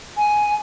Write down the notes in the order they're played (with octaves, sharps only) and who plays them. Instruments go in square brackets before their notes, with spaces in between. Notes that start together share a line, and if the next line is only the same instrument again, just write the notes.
[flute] G#5